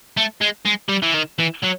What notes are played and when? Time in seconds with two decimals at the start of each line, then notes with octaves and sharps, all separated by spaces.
0.17 A3
0.41 G#3
0.66 G#3
0.89 G3
1.03 E3
1.14 D#3
1.39 E3
1.63 F#3